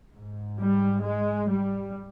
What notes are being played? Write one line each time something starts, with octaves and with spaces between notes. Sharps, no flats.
G#2
G3
G#3
G3